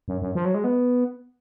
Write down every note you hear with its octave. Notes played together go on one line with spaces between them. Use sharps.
F#2
F#2
F3
F#3
G#3
B3